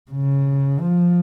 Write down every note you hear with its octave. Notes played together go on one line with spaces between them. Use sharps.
C#3
F3